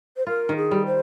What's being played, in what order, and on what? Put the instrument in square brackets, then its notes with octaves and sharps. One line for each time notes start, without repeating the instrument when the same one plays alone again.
[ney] C5
[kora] F4 [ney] A#4
[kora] D#3
[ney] G#4
[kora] G3
[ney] C5